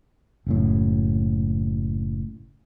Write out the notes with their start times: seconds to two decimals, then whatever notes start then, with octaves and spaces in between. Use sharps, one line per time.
0.47 F#1 F#2 A2